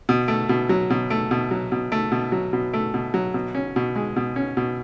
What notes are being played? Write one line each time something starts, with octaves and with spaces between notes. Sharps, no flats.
B2
A3
B2
F#3
B2
A3
B2
F#3
B2
A3
B2
F#3
B2
A3
B2
F#3
B2
C#4
B2
G#3
B2
C#4
B2